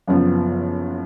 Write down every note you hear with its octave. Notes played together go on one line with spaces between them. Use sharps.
F#1 F#2 F3 B3